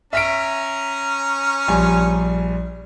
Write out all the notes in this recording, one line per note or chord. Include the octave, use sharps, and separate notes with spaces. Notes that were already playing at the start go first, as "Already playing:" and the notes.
C#4 E5 A#5 B6 D7
A#1 G3 G#5